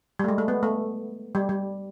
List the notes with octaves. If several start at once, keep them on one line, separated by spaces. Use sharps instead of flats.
G3
A3
G#3
A3
B3
A3
G3
G3